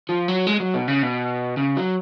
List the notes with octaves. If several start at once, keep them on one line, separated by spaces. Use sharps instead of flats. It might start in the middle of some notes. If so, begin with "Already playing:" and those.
F3
F#3
G#3
F#3
B2
C#3
B2
C#3
F#3